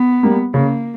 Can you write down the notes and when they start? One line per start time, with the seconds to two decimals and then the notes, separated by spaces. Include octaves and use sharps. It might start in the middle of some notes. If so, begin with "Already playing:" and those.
Already playing: B3
0.23 G3 A#3
0.54 C#3 A#3